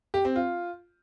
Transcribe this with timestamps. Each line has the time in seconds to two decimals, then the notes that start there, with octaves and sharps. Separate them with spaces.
0.14 G4
0.25 C4
0.36 F4